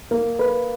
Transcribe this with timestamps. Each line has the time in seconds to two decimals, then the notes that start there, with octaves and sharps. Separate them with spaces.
0.11 A#3
0.39 B4